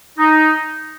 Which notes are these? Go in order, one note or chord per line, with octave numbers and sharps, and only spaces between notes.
D#4